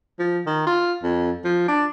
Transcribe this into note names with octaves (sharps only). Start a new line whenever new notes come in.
F3
D#3
F4
F2
F3
D4